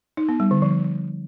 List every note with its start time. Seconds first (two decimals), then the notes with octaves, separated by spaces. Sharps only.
0.17 D#4
0.29 B3
0.40 G3
0.51 D3
0.62 F3